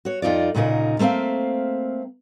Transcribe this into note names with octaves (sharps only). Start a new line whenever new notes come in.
F#4 C#5
F2 D#4 F4 D5
D2 A#2 C#3 D#4 A#4
A3 A#3 C4 E5 F5